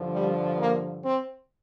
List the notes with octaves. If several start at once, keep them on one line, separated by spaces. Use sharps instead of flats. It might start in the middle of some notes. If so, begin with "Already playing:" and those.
Already playing: G2 D3 F3
G3
A#3
C4